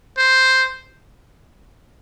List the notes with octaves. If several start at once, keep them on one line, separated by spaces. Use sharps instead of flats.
C5